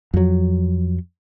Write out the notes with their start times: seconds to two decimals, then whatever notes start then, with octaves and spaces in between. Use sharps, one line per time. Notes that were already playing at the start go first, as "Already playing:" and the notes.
0.14 F2 F#3